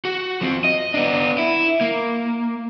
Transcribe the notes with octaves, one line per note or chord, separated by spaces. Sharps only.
F#4
F3 C4
D#5
B3 D4
E4
A#3